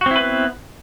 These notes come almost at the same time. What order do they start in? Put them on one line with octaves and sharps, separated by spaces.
F#4 C4 E4 B4 B3